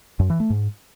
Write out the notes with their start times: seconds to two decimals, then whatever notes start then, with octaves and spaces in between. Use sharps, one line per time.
0.19 F#2
0.30 E3
0.40 A3
0.50 G#2